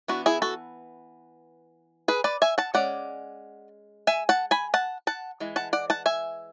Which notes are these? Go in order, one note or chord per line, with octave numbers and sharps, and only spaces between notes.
E3 B3 D4 F#4
E4 G#4
F#4 A4
G#4 B4
B4 D5
E5 G#5
F#5 A5
G#3 C#4 D5 F#5
E5 G#5
F#5 A5
G#5 B5
F#5 A5
F#5 A5
E3 G#3
F#5 A5
D5 F#5
F#5 A5
E5 G#5